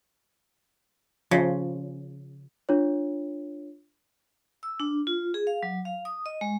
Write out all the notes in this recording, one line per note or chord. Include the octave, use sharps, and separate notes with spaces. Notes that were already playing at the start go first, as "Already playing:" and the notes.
C#3 F3
D4 F4 C#5
E6
D4
F4
G#4
F5
F#3
F5
D#6
D#5
G#3